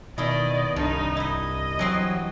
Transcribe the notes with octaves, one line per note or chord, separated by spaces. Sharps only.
B2 D#3 D#4 E4 D5 D#5
C2 G2 D#4
E4 D#5 E5
E3 F#3 C4 C6